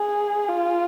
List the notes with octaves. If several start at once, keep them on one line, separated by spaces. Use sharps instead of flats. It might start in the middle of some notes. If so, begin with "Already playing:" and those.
Already playing: G#4
F4